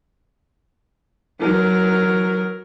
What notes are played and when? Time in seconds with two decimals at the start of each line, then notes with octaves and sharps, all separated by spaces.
1.40 F#3 A#4